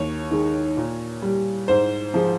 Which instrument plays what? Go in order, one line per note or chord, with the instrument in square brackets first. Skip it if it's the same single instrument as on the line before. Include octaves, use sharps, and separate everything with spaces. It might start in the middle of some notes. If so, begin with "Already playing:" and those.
Already playing: [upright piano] D#2 C#5
D#3 G#3
A#2
G3
G#2 C5
F3 G#3